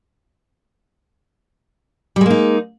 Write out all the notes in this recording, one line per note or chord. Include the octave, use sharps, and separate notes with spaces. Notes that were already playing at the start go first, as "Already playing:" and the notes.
G3 G#3 A#3 D#4